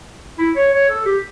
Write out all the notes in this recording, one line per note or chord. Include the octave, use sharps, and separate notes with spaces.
E4
C#5
C#5
A4
G4